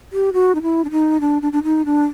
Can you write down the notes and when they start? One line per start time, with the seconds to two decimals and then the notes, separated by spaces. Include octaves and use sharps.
0.13 G4
0.33 F#4
0.55 D#4
0.62 E4
0.84 D4
0.91 D#4
1.21 D4
1.42 D4
1.52 D4
1.63 D#4
1.85 D4